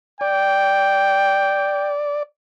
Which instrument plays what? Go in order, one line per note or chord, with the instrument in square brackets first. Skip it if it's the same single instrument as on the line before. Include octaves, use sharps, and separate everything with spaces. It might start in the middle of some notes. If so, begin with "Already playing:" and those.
[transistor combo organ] D5 [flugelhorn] G5